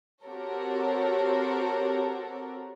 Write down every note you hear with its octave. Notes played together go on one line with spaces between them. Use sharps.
C4 F#4 G4 A4 A#4 C#5